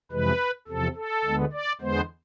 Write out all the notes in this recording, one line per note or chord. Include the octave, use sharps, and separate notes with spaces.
F2 C3 E3 G#3 B4
E2 C3 F3 A4
A4
D2 D3 G#3 B3
D5
E2 D3 G#3 B3 C5